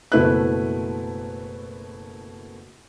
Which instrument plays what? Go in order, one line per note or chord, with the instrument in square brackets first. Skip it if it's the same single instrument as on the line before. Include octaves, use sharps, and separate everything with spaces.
[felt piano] F#1 B2 A3 E4 B4 F#6